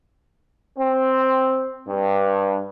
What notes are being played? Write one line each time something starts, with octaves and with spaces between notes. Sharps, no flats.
C4
G2